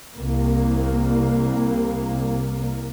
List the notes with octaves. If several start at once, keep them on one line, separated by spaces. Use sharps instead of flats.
C2 A#3